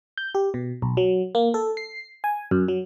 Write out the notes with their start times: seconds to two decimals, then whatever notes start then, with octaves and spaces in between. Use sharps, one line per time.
0.18 G6
0.35 G4
0.54 B2
0.82 B1
0.97 F#3
1.35 A#3
1.54 A4
1.77 C7
2.24 G#5
2.51 F#2
2.68 F#3